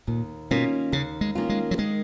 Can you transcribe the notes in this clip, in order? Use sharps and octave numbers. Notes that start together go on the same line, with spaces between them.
D#2 A#2
B2 D#3 A#3 C#4 F4
D#2 C#3
G#3
D#3 A#3 C#4 F4
G#3
F#3
D#3 G#3